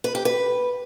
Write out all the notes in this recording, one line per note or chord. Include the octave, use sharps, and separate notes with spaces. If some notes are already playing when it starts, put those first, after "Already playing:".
B4
G4
B4